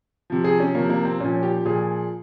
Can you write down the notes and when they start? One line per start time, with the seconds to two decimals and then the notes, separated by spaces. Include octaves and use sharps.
0.30 C3 F3
0.44 G#4
0.60 C#4
0.75 C3 F3 A#3
0.90 A#3
1.05 C4
1.20 A#2 F3 C#4
1.43 G4
1.65 A#2 F3 G#4